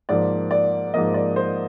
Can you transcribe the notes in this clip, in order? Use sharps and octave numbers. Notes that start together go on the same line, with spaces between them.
G#2 F3 A#3 D5
D5
G#2 F3 A#3 D#5
D5
C5